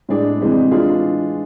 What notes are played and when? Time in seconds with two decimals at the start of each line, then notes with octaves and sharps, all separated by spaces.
0.09 A2 G#3 D4 G#4 D5
0.41 C3 E3 G#3 C4
0.71 E3 G#3 D4 F4 G#4